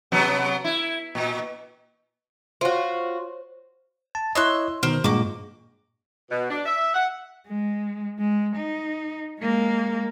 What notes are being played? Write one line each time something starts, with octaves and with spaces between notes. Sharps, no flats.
C3 F#3 B3
E4
A#2
F4 F#4 C5 C#5
A5
E4 C#5 D#5 C6 E6 F#6
B2 D#3 A#4 C5
G2 A#2 G#3 F#4 D6
B2
D4
E5
F#5
G#3
G#3
D#4
G#3 A#3